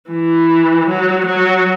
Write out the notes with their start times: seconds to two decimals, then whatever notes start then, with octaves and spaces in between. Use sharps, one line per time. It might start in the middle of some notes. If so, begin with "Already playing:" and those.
0.11 E3
0.89 F#3
1.27 F#3